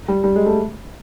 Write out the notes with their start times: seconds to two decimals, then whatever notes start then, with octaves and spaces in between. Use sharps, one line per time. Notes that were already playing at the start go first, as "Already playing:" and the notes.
0.08 G3
0.24 G3
0.36 G#3
0.46 A3